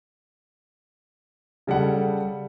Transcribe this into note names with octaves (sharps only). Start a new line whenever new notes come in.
C#3 G3 A4 F#5